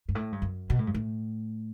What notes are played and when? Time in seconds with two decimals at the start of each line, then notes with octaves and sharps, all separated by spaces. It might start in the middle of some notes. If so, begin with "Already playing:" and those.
0.09 G2
0.15 A2
0.32 G2
0.42 F#2
0.70 B2
0.79 A2
0.87 G2
0.94 A2